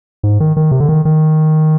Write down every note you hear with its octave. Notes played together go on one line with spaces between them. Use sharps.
G#2
D#3
D#3
C3
D3
D#3
D#3